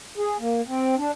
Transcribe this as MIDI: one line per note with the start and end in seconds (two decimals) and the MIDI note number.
0.18 0.37 68
0.40 0.61 58
0.68 0.95 60
0.97 1.11 62